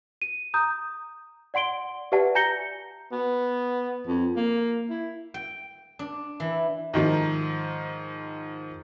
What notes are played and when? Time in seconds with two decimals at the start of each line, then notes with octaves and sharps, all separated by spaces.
0.22 D#7
0.54 A#5 D#6 G6
1.54 D5 F#5 C6 D7 G7
2.12 G4 B4 D5 E5 F#5 A5
2.35 G#5 A#5 G6 A#6 C#7 G7
3.12 B3
4.07 F2
4.37 A#3
4.90 E4
5.34 G5
5.99 D4
6.40 E3
6.94 G#2 D#3 F3